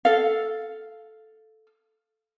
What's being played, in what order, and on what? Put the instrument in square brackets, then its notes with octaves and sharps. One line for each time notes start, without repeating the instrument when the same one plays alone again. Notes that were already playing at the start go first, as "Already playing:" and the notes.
[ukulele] A4 F5